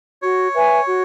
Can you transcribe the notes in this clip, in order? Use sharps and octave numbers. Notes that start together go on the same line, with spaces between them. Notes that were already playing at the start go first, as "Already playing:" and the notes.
F#4 C#5
B4 E5 G#5
F#4